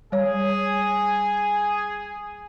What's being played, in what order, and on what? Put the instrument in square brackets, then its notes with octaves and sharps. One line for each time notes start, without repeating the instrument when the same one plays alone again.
[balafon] G3 C#5 [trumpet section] G#4